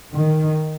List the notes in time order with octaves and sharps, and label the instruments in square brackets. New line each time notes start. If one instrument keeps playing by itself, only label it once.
[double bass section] D#3